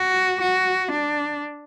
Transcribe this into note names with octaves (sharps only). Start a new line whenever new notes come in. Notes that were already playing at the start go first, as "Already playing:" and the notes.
Already playing: F#4
F#4
D4